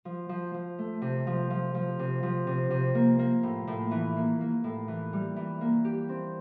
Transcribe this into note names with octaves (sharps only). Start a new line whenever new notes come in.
F3
F3
F3
A3
C3
F3
F3
F3
C3
F3
C3
C3
A#3
A#3
A2
A2
E3
A#3
A#3
A2
E3
G3
E3
A#3
G4
C4